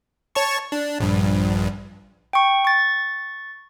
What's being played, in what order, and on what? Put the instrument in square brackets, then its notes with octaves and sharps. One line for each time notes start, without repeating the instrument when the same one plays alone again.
[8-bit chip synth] C#5 A5 C#6
D4
A#1 G2
[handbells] G5 C#6
C#6 A6